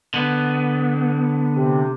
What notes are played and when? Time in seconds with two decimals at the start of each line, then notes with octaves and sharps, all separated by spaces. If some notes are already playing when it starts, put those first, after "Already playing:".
0.14 D3 B3
1.55 C3